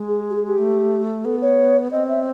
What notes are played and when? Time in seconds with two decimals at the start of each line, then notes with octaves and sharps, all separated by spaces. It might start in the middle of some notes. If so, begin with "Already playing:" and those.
Already playing: G#3
0.08 G#4
0.30 G4
0.36 G#4
0.47 G4
0.58 A3
1.24 B3 A4
1.42 C#5
1.91 C4 D#5
2.08 E5